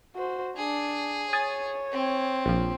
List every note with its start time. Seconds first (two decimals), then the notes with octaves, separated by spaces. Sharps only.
0.16 F#4 C5
0.57 D4 G#4
1.33 C#5 G#5 D#6 A6
1.92 C4
2.46 A#1 F3